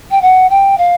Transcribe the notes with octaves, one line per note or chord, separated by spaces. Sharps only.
G5
F#5
G5
F5